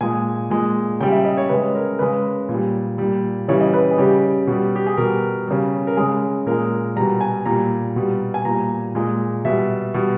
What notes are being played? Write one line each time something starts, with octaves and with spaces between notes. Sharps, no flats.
A#2 G#3 G#5
A#2 G#3
C#3 G3 G5
E5
D#5
C#5
C#3 G#3 B4
A#4
C#3 G#3 B4
A#2
G3
A#2 G3
C#3 E3 G3 C#5
D#5
B4
G#4
C#3 G3 G4
B2 G3
G4
G#4
B2 G3 A#4
C#3 G3
A#4
C#3 G#3 G#4
A#2 G#3 A#4
B2 G3 A#5
G#5
A#2 G3 A#5
B2 G3
G#5
A#2 G3 A#5
A#2 G#3
B2 G3 E5
B2 G3